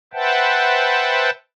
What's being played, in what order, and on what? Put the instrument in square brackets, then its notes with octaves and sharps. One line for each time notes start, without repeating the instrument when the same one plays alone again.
[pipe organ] B4 C5 E5 F#5 G5 A5